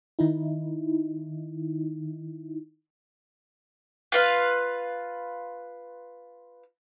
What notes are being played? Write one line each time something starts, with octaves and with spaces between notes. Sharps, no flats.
D#3 D#4 E4
F4 B4 F5